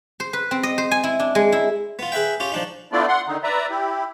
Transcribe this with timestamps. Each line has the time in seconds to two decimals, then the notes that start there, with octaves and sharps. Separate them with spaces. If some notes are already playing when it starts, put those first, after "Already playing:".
0.20 C5
0.33 B4
0.51 C4
0.63 D#5
0.78 C5
0.91 G#5
1.04 E4
1.19 D4
1.35 G#3
1.52 E4
1.99 B3 F4
2.12 G#4 B4 E5 G5
2.40 C#4 F4 G4
2.52 F3 D4 D#4
2.92 A3 B3 D4 E4 F4 D5
3.08 F#5 C6
3.27 D3 D#3 D#4
3.43 B4 D5 E5 A#5
3.70 E4 G4